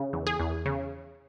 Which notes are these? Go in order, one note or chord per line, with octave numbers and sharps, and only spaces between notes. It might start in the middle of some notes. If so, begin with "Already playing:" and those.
Already playing: C#3
E2
G#4
E2
C#3